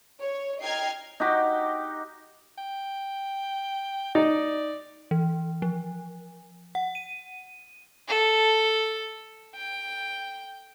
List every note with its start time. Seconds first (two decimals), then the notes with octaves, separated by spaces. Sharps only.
0.22 C#5
0.62 D#5 G5 A#5 F6 G#6 C7
1.20 D#4 F#4 G4
2.58 G5
4.15 D#4 D5
5.11 E3
5.62 F3
6.75 F#5
6.95 D#7
8.08 A4
9.56 G5